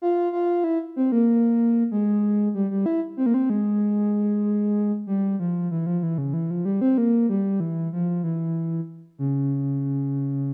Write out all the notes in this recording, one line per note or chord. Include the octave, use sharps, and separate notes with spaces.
F4
F4
E4
C4
A#3
G#3
G3
G3
E4
C4
A#3
C4
G#3
G3
F3
E3
F3
E3
C#3
E3
F3
G3
C4
A#3
G3
E3
F3
E3
C#3